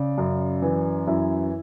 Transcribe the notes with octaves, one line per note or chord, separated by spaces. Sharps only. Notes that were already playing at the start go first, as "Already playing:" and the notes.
Already playing: C#3 D5
F#2
E3
F#2 E4